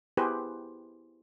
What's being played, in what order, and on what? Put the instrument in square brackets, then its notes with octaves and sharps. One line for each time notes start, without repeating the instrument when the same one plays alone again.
[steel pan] B3 E4 G4 G#4 B4 C5